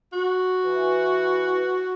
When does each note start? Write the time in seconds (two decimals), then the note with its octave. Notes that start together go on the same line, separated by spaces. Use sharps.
0.12 F#4
0.64 E3